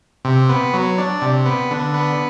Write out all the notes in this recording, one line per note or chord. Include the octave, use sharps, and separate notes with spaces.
C3
B3
F#3
D4
C3
B3
D3
B3